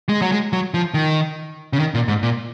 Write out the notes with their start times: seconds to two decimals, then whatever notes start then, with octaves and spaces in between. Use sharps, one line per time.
0.09 G#3
0.22 F#3
0.32 G#3
0.53 F#3
0.74 F3
0.94 D#3
1.73 C#3
1.79 D#3
1.94 A#2
2.08 G#2
2.23 A#2